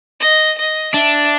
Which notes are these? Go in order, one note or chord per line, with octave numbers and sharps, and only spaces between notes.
D#5
D#5
D4 E5